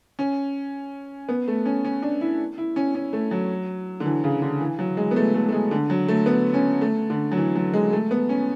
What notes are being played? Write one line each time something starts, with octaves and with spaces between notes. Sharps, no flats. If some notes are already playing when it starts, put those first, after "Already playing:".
C#4
B3
A3
C#4
C#4
D4
E4
E4
C#4
C#4
A3
F#3
D3
E3
C#3
D3
E3
F#3
G#3
B3
A3
A3
A3
G#3
D3
F#3
A3
B3
C#4
A3
D3
F#3
E3
F#3
G#3
A3
B3
C#4